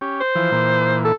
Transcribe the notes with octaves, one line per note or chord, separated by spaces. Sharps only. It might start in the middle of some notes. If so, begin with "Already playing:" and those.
C#4 G4
C5
E3 F3
A#2 E3
A4